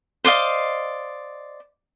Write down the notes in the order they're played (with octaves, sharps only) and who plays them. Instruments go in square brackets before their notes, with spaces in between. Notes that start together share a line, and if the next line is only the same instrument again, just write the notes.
[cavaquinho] C5 D5 D#5 F5